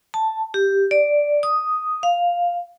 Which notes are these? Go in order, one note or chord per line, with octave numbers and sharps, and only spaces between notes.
A5
G4
D5
D#6
F5